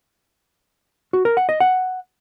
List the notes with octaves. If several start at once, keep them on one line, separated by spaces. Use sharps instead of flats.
F#4
A#4
F#5
D#5
F#5